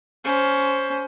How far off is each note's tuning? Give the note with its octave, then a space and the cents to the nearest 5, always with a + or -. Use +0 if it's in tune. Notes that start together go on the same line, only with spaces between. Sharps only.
C#4 +20 C5 +10